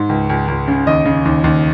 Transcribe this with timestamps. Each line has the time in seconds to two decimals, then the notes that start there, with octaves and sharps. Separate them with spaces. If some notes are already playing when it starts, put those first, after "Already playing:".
Already playing: G#2
0.09 C#2
0.29 C#2
0.48 C#2
0.68 C#3
0.87 D#2 D#5
1.05 C#3
1.25 D#2
1.44 D#2